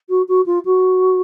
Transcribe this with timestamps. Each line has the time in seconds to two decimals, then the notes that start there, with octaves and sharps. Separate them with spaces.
0.09 F#4
0.28 F#4
0.46 F4
0.65 F#4